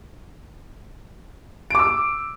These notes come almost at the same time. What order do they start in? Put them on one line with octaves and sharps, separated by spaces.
D7 D6 E6